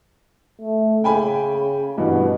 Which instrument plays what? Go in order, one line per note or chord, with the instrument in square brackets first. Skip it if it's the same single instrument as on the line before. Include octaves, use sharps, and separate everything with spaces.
[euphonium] A3
[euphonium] C#3 [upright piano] G5 G#5 B5
[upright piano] G2 E3 [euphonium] B2